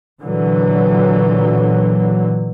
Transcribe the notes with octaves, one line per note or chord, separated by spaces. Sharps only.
A#2 D3 E3 F#3